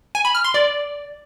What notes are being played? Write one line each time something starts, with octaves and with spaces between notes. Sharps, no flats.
G#5
B5
F6
C6
D5